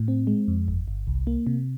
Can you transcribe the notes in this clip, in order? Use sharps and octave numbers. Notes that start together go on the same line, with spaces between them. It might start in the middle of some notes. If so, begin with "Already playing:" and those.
Already playing: A2
C4
G#3
F2
G1
G1
C2
A#3
C3